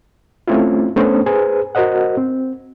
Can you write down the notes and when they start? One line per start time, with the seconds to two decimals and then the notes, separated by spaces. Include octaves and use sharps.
0.48 A3 C4 C#4 E4 F4
0.96 A3 B3 C#4 D4 A4 C5
1.26 G#4 B4 C5 G#5
1.75 F#4 A#4 C5 D#5 F#5
2.18 C4